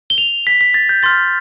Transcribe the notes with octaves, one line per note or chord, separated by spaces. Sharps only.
G7
F7
B6
B6
A6
G6
C6 F6 A6